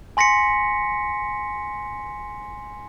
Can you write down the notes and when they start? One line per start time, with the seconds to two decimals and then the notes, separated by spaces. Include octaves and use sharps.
0.17 G#5 C6 A#6 B6 C#7